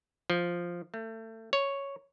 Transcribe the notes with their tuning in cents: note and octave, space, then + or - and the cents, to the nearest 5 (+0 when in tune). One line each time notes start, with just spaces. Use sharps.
F3 +0
A3 +30
C#5 +0